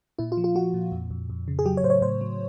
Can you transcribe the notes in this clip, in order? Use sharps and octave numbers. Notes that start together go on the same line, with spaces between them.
A#2 E4
F4
F3
F4
F3 F#4
A#2
F2
F2
F2
C#3
G#4
F#3 G4
C#5
A2 C5
C#5
A2 C5
F#3